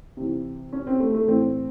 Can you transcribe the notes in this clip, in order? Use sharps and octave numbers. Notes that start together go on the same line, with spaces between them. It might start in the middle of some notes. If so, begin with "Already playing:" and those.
C3 E3
C#4
C4
A3
A3
A2 E3 C4